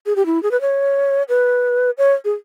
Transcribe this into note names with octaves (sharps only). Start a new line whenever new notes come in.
G#4
G4
E4
G#4
B4
C#5
B4
C#5
G#4